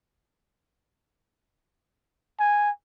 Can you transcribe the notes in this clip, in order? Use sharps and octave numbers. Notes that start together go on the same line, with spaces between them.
G#5